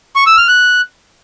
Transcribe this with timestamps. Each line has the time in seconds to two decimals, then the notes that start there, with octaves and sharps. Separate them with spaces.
0.16 C#6
0.27 E6
0.37 F6
0.48 F#6